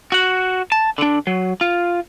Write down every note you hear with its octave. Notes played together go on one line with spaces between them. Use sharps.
F#4 F#5
A5
D3 D4
F#3
F4